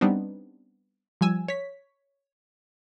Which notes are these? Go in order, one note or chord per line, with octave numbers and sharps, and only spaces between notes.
G3 B3 C4 D4 D#4
F3 G3 G#5 E6
C#5 B6